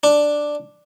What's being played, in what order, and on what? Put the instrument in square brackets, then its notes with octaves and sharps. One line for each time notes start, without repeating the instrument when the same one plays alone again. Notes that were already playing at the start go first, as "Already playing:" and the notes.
[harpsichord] D4